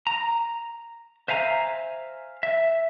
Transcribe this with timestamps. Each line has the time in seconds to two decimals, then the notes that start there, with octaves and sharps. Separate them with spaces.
0.07 A#5
1.28 C5 E5 F5 G#5 A#5
2.43 E5